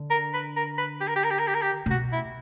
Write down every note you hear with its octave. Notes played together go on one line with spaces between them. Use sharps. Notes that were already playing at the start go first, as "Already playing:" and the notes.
Already playing: D3
A#4
B4
A#4
B4
G4
A#4
G4
A#4
G4
A#4
G4
A#4
G4
A#2
B2 F#4
E4